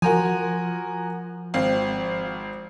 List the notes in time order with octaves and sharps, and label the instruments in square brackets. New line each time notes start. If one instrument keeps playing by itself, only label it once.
[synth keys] F3 [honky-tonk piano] F#4 A#4 G#5
[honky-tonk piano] G#1 C4 F5